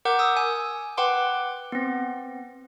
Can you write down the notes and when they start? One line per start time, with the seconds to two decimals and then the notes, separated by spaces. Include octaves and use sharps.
0.05 A#4 F#5 D6 G6
0.19 D#6 E6
0.37 G#5
0.97 B4 F#5 G5 C6 D6
1.72 B3 C4